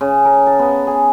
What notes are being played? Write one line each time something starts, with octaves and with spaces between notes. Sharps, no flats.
C#3
A#4
A5
B3
G#4